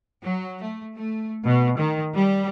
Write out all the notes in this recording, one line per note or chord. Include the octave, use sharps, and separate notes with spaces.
F#3
A3
A3
B2
D#3
G3